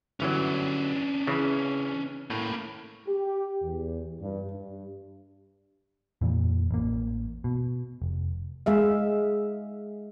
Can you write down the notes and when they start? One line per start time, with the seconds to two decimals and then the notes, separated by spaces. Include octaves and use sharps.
0.20 G1 E3 F#3 C#4 D4
1.27 C#3 E3
2.30 A2 A#3 B4
3.08 G4
3.62 E2
4.20 G2
4.51 G2
6.21 F2 A#2 E3
6.71 A1 A#3
7.44 B2
8.02 F1
8.66 G#3 G#4 E5 F5